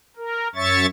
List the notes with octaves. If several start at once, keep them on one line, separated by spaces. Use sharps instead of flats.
A#4
F#2 C#5 E5 C#6 A6